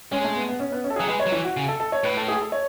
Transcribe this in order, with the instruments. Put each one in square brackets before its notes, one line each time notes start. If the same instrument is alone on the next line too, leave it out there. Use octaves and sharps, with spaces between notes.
[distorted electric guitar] G#3 [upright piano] C#4
[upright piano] A3
B3
B3
C#4
B3
C#4
A4
G#4
[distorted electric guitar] F#3
[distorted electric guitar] G#3 [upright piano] B4
[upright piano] C#5
[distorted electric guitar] F#3
[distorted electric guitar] E3 [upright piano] E4
[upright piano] F#4
[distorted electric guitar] C#3
[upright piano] A4
A4
C#5
[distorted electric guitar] A2 [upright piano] B4
[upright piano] A4
G#4
A4
C#5